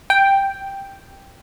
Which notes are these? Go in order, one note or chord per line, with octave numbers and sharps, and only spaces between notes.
G5